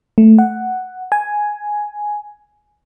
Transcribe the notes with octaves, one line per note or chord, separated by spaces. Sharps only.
A3
F#5
G#5